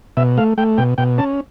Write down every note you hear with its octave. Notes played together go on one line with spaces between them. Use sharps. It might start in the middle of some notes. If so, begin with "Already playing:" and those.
B2 E5
A3 F5
A3 G5
B2 G5
B2 G5
C#4 A5